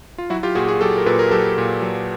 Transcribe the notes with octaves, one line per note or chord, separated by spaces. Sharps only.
F4
F#3 E4 F#4
F4 G4
A#2 F#4 G#4
F#4 G#4
F#3 G4 A4
A#4
A#2 A4 B4
G#4 A#4
F#3 G4 A4
A#2
F#3